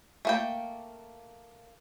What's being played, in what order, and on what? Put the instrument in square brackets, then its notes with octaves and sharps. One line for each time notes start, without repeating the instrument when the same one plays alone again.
[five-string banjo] A3 A#3 G5